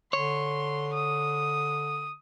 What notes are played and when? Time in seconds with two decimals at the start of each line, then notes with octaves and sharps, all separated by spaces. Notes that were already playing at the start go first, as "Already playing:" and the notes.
0.13 D3 C#5 C6
0.95 D#6